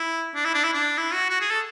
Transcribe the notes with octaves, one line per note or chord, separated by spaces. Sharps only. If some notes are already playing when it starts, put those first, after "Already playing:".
Already playing: E4
D4
E4
D4
E4
D4
E4
F#4
F#4
G#4
A4